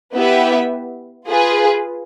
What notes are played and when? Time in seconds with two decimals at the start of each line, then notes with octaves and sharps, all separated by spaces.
0.14 B3 E4 G4 B4 E5
1.27 F4 G#4 B4